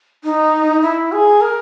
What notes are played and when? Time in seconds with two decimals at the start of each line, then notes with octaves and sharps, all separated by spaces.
0.24 D#4
0.82 E4
1.12 G#4
1.41 A#4